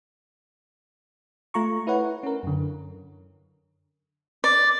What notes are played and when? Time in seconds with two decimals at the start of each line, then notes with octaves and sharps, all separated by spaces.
1.54 A3 F4 A#5 C#6
1.87 E4 B4 C#5 F#5
2.23 C#4 A#4
2.43 F#2 D3
4.44 D5